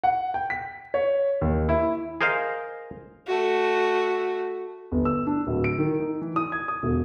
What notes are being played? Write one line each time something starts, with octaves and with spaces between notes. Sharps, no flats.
F#5
G5
B6
C#5
D#2
E4
G#4 A#4 C5 D#5 F5
A3 F#4
G1
E6
D4
D1
D7
D#3
D#4
E3
D#6
G#6
D#6
E1